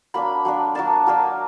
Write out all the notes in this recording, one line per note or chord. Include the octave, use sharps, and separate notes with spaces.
F#3 A#3 D4 B5
F#3 A#3 D4
F#3 A#3 D4 A5
F#3 A#3 D4